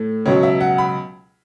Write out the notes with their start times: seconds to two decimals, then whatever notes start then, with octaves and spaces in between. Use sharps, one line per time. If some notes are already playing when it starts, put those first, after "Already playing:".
Already playing: A2 A3
0.26 C#2 B2 F#3 C#5
0.43 E5
0.61 F#5
0.78 B5